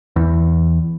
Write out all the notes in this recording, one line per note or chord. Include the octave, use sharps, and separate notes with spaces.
E2